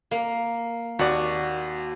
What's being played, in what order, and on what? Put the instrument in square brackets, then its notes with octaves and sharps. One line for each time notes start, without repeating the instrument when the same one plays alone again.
[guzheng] A#3
[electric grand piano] D#2 D5 [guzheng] F#4